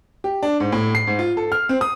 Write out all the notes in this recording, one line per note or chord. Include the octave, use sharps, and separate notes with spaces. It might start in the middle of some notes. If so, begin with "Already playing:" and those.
G4
D4
G#2
A2
C7
G#2
F4
A4
F6
C4
D#6